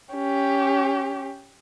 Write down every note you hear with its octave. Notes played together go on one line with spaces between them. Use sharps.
C#4 G4